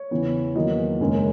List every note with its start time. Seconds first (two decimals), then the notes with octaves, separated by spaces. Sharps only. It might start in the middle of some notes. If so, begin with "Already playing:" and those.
Already playing: C#5
0.11 E2 C#3 E3 B3
0.55 E2 D#3 F#3 A#3 D#5
1.00 F#1 F#2 D#3 G#3 C#4